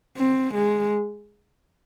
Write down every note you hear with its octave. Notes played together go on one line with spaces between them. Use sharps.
C4
G#3